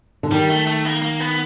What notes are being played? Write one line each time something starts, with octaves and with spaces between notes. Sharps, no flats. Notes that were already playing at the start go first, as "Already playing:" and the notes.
D3
D#3 G3
A3
A3
A#3
A#3
B3